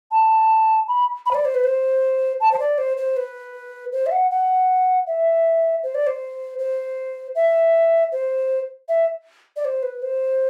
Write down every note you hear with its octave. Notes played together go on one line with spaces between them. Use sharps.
A5
B5
B5
C5
D5
C5
B4
C5
A5
C5
D5
C5
C5
B4
C5
E5
F#5
F#5
E5
C5
D5
C5
C5
E5
C5
E5
D5
C5
B4
C5